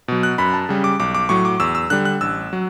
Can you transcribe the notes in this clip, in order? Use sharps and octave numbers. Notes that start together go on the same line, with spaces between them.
B2 F#3
F#6
F#2 B5
A5
C#3 G3
D6
B1 D6
D6
A2 F#3 C#6
D6
E2 E6
E6
D3 G3 F#6
F#6
A1 E6
F#3